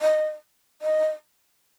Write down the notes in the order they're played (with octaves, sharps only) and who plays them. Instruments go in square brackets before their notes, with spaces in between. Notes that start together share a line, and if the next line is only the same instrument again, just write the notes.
[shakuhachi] D#5
D#5